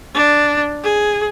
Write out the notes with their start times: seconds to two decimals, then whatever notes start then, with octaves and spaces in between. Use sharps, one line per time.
0.14 D4
0.84 G#4